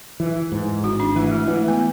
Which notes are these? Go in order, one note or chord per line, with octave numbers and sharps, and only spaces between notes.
E3
G#2
G#1 F#4
D4
E3 A3
G#3
E3 A3
B3